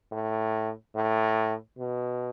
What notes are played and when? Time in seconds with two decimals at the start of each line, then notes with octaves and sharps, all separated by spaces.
0.12 A2
0.96 A2
1.79 B2